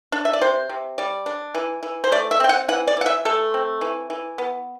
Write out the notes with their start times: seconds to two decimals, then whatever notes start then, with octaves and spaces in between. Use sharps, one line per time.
0.12 D4
0.25 E5
0.33 D5
0.41 C3 C5
0.69 C3
0.98 G3 D5
1.26 D4
1.54 E3
1.83 E3
2.04 C5
2.12 A3 D5
2.31 E5
2.40 C4 G5
2.49 F#5
2.68 E3 F#5
2.87 D5
2.97 E3 F#5
3.06 E5
3.25 A3 A4
3.54 C4
3.81 E3
4.10 E3
4.38 B3